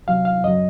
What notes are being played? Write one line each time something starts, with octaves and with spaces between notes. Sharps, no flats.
C2 C3 F#3 F5
F5
F#2 C#3 F#3 D#5